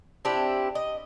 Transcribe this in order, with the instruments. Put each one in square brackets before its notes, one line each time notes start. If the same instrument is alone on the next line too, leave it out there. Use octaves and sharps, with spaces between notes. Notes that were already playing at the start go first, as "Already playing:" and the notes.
[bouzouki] C4 D4 E4 G4
D#5